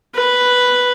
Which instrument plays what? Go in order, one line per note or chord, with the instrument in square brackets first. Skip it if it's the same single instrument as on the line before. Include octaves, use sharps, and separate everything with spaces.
[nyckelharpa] B4